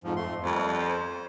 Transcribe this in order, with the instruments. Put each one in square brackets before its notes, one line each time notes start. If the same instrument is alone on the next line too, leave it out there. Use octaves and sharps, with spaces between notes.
[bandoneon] F2 G#2 F3
F2 A3 C6
[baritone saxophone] F2 [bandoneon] G3
[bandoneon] C5